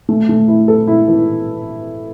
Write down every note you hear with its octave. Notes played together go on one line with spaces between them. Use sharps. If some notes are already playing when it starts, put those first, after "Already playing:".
A3
A3
E4
A4
E4
E3